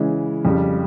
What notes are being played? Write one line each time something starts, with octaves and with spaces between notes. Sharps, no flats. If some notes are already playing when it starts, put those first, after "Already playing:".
Already playing: C#3 E3 G#3 C#4
F2 C#3 G3